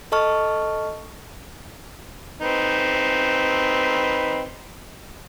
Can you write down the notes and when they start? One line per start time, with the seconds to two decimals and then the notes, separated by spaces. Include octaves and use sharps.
0.12 A4 D#5 A5 C#6 F6
2.42 C4 D#4 B4